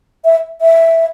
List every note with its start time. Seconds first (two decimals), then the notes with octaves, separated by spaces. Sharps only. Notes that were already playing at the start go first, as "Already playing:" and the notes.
0.25 E5
0.61 E5